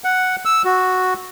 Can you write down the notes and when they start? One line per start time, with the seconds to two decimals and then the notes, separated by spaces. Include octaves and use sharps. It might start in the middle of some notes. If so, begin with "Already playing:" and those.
0.04 F#5
0.45 E6
0.65 F#4